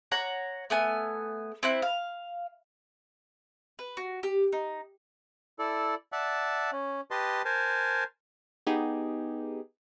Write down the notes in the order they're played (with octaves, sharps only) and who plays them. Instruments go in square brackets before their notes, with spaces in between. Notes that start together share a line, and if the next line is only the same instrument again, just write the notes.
[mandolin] C#5 F#5 A#5
A3 B3 G#5
C4 E4 F#6
F5
B4
F#4
G4
D#4
[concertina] E4 A4 D5
D5 E5 F#5 A5
C#4
G4 B4 D#5 A5 C6
A#4 C5 G#5 A5
[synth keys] B3 D#4 G4 G#4